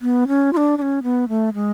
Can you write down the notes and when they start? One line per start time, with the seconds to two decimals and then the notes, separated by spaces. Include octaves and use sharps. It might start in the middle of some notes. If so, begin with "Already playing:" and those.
0.02 B3
0.28 C#4
0.53 F4
0.57 D4
0.78 D4
0.82 C#4
1.03 B3
1.28 A3
1.54 G#3